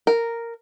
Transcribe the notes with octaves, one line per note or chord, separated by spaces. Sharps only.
A#4